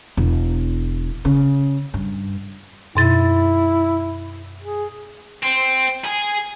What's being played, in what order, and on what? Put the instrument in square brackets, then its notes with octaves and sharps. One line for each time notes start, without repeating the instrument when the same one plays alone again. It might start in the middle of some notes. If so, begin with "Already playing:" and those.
[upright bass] E1
C#3
G2
[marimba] F#2 B2 A6 [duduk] E4
[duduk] G#4
[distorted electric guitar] C4
G#4